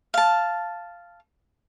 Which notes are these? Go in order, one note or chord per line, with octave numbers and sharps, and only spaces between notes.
F5 A5